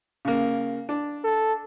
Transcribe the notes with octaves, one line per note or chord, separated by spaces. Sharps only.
C#3 A#3
D4
A4